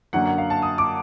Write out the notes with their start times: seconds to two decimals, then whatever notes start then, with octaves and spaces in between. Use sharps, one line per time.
0.13 F#2 D3 F#3 A#3 F#5
0.26 F#5
0.38 F5
0.50 A5
0.62 D#6
0.78 D6